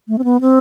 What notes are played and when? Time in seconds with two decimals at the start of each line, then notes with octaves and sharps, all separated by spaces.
0.08 A3
0.18 C4
0.24 B3
0.41 C4